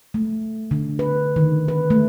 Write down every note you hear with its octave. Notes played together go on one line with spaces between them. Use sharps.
A3
D3
B4
D#3
B4
A3